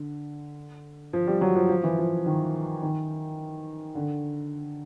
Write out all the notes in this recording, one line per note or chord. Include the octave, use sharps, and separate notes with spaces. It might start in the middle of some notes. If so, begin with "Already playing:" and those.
Already playing: D3
F3
G3
F#3
F3
F3
E3
F3
D#3
D#3
D3